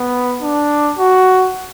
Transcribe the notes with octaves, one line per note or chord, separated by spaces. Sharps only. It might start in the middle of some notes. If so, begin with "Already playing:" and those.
Already playing: B3
D4
F#4